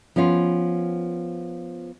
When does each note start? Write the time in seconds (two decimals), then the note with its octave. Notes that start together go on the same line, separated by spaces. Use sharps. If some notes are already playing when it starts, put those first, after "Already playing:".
0.16 F3 B3 C#4 F4